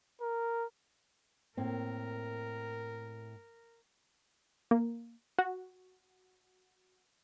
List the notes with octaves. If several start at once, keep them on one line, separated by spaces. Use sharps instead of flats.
A#4
A2 A#3 C4 A#4
A#3
F#4